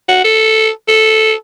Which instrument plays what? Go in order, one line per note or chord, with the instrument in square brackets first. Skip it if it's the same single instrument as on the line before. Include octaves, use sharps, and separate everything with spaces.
[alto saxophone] F#4
A4
A4